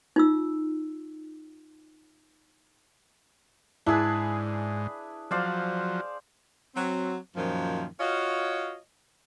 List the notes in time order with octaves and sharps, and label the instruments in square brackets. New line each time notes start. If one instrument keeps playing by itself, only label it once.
[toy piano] D#4 F4 E6
[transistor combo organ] G#2 [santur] D4 G#4 B4 [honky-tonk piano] E4
[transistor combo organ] F3 F#3 [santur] C5 D5 F5
[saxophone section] F#3 C4
F#2 A#2 D#3 F3
F4 F#4 C#5 D#5 F5